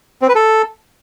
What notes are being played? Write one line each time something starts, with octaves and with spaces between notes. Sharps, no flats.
C4
B4
A4